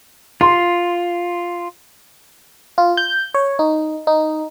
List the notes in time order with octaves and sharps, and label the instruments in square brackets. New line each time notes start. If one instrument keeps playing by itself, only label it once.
[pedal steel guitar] F4 [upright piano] C6
[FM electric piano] F4
G6
C#5
D#4
D#4